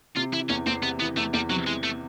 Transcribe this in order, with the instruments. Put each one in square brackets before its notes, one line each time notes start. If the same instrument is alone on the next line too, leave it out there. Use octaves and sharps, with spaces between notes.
[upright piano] C3 [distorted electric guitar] F4
[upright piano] E3 [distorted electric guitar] E4
[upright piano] E2 [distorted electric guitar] C#4
[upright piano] E2 [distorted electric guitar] C4
[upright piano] C3 [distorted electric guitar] B3
[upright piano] E3 [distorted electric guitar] B3
[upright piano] E2 [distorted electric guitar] A3
[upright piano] E2 [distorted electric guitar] G3
[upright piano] C3 [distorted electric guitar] F#3
[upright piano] E3 [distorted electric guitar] G#3
[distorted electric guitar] A3